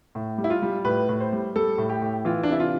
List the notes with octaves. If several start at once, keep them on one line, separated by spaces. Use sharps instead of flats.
A2
G3
E4
F4
G3
A2 B4
A2
C5
G3
G3 A4
A2
G4
A2
E3 F4
D4
C3 E4
F4